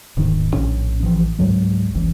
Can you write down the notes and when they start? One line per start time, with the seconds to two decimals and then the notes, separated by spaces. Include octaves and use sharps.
0.17 D#1 G#2 D#3
0.53 A#1 A2 C#4
1.03 A1 E3 F3
1.39 C#2 G#2 F#3 G#3
1.94 F#1 C#2 E3